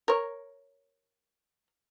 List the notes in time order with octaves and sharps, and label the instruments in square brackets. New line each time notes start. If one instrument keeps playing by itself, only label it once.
[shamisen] A#4 C#5